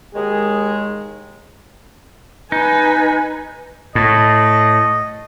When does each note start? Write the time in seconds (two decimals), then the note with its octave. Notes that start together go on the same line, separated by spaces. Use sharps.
0.15 D#2 D#3 G#3 G#4
2.52 D#4 B4 G#5
3.95 A2 D#5